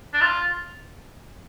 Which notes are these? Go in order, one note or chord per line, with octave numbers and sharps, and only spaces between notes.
D4
F4